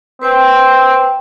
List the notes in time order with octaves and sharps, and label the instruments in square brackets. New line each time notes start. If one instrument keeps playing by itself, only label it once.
[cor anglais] C4 [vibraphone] B4 C5 G5